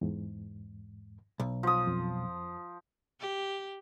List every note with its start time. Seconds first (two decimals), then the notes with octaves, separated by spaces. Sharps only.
0.01 E2 G#2
1.40 B1
1.63 F3 D#6
1.87 F2
3.20 G4